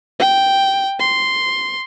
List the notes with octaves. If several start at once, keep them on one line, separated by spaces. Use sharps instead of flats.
G5
C6